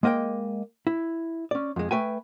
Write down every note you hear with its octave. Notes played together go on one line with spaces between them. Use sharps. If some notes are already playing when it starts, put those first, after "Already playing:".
G#3 A#3 D#5 F5 G5
E4
C#4 D5
F2 G#3
A3 B4 G5 G#5